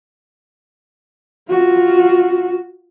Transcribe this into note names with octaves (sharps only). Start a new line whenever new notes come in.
F4 F#4